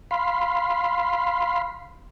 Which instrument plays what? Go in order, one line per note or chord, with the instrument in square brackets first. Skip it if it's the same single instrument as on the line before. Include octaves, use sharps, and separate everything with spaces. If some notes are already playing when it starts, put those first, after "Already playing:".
[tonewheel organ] F5 B5 C6